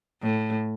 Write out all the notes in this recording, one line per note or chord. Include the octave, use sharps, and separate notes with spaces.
A2